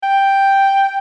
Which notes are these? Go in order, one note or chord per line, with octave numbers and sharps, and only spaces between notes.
G5